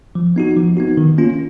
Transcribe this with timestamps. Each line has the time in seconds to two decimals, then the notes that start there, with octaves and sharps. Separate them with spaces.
0.15 F3
0.36 B3 D#4 F#4
0.56 F3
0.77 B3 D#4 F#4
0.97 D#3
1.18 A#3 C#4 F4